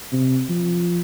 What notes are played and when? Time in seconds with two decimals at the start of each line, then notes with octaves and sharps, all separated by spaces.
0.12 C3
0.49 F3